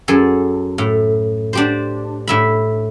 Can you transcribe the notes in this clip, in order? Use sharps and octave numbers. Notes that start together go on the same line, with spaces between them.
F#2 G#4 A4
A2
D4 G4 C5
A2 E5 B5